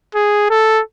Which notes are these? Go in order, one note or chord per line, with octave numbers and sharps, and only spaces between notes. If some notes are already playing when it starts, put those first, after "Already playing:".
G#4
A4